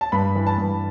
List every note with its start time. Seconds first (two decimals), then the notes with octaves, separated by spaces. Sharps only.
0.01 A5
0.12 G2 B5
0.35 E3
0.47 A5
0.58 G2